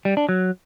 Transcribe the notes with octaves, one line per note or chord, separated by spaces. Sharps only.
G3
D4
F#3